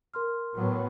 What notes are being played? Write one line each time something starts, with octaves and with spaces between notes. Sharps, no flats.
A#4 C6 F6
A2 F#3 B3